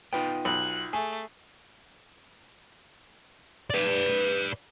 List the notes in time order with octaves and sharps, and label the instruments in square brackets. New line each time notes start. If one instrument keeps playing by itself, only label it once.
[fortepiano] B3 [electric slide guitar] D#4 F4 G5
[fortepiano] B1 [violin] F#6
[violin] A3 [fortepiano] G#4
[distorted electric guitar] B4 D5